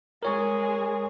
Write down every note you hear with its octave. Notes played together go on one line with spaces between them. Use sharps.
G#3 G#4 A#4 C#5 C#6